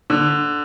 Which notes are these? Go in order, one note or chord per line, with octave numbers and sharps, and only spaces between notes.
D3